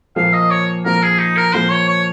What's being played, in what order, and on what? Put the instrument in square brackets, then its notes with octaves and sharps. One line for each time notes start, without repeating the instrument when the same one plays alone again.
[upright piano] A#2 F3 A#3 [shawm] F5
[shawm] D#5
C#5
[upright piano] A#2 F3 A#3 [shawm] A#4
[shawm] G#4
D#4
A#4
[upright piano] A#2 F3 A#3 [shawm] C5
[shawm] C#5
C#5